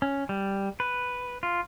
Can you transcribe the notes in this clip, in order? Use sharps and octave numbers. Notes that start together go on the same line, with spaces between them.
C#4
G3
B4
F4